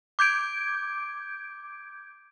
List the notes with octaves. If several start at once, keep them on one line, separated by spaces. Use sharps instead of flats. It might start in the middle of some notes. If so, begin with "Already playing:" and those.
D6 G6 G#6 D7